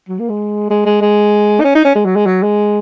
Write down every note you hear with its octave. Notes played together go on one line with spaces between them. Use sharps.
F#3
A#3
G#3
G#3
G#3
G#3
D#4
C#4
D#4
C#4
G#3
F#3
G#3
F#3
G#3